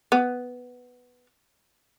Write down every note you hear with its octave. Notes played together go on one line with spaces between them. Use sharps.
B3